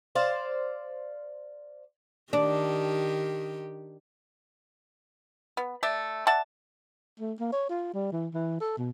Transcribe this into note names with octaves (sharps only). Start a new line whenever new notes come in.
C5 D5 F5
D#3 D4 G4
B3
A3 D5 E5
D5 E5 F#5 A5
A3
A#3
C#5
F4
G3
E3
E3
A4
B2